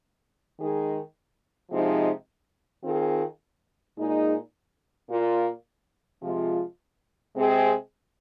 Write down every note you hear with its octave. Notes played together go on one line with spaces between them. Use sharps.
D#3 G#3 D#4 G#4
C3 F3 G#3 D#4
D#3 C4 F4 G#4
A#2 G#3 D#4 G#4
A#2 A#3 F4
C3 F3 G#3 F4
C3 G#3 C4 G#4